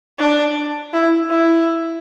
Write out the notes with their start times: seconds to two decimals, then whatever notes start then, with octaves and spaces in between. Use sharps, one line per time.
0.18 D4
0.93 E4
1.30 E4